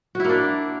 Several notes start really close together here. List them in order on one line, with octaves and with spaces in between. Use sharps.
F#4 E4 A#3 D4